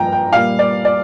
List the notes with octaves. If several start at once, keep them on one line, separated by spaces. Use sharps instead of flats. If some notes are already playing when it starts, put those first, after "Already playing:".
Already playing: G2 F3 A#3 G5 A#5
G5
A#2 G3 A#3 F5
D5
D5